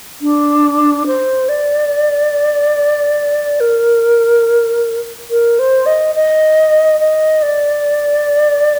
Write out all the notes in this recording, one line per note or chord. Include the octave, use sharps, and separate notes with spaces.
D4
C5
D5
A#4
A#4
C5
D#5
D#5
D#5
D5